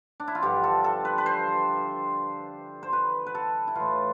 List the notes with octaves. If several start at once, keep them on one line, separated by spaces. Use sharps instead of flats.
D4
E4
F4
G2 D3 F3 G4
A4
A4
B4
B4
C5
C5
B4
B4
A4
E4
A2 E3 F4